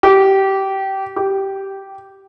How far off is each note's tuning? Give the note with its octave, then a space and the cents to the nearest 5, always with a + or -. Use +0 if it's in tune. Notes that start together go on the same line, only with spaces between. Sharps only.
G4 -20
G4 -10